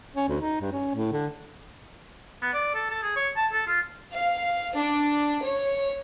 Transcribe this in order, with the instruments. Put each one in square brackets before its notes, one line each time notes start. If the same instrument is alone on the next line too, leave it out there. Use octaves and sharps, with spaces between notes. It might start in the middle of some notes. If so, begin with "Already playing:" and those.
[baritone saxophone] C#4
D2
D#4
G2
C#4
A2
D3
[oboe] B3
D5
A4
A4
G#4
C#5
A5
A4
F4
[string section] F5
D4
C#5